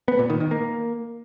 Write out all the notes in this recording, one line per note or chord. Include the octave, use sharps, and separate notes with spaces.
B3
A#2
D#3
D#3
A#3